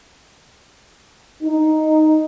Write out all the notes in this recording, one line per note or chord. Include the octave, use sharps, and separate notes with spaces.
D#4